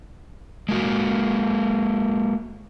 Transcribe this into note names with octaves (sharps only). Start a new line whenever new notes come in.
G#3 A#3 F#4